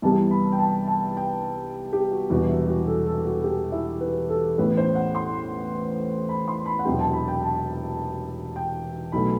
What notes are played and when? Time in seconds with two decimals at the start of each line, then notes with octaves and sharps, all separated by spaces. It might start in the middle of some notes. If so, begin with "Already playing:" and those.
0.02 C2 C3 E3 G3 B3 A5
0.31 B5
0.52 G5
0.59 A5
0.88 A5
1.17 G5
1.93 G4
2.11 F#4
2.30 E1 E2 C3 E3 G3 F#4
2.49 E4
2.68 F#4
2.87 A4
3.06 A4
3.26 F#4
3.44 G4
3.72 E4
4.00 B4
4.29 A4
4.58 A1 A2 E3 B3 B4
4.77 C5
4.95 F#5
5.15 C6
6.29 B5
6.48 C6
6.66 B5
6.79 F#5
6.85 E1 E2 C3 F#3 G5
7.00 A5
7.13 B5
7.28 G5
7.43 A5
8.56 G5
9.12 B1 B2 A3 B5